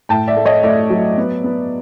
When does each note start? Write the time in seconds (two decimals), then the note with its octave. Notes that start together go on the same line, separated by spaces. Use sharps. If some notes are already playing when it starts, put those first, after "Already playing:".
0.09 A2 G5 A5
0.28 D5 E5
0.37 A3
0.45 C#5 D#5
0.63 A3 D5 E5
0.90 F#3
1.17 B3
1.44 B3